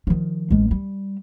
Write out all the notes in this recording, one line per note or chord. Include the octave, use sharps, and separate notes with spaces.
D#3 F3
A1 G#3
G3